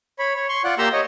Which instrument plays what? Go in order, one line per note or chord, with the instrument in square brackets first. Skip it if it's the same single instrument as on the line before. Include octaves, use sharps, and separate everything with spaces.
[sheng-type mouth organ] C#5 B5
C#5
C6 C#6
F4 D5 F#5
A#3 G4 A#5 C6 E6
C#5 D#5